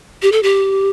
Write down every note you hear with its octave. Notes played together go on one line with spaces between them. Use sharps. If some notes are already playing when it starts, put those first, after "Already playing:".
G4
A4
G4